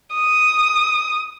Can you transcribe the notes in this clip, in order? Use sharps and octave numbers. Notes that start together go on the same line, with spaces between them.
D#6